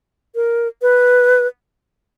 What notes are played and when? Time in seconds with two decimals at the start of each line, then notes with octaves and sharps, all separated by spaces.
0.35 A#4
0.82 B4